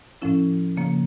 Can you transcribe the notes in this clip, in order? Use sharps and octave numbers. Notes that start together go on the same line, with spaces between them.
A2 F3 C#4 E4
C#3 F3 A#3